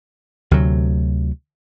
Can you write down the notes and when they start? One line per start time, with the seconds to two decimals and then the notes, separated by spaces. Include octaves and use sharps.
0.51 D2 C3 F#3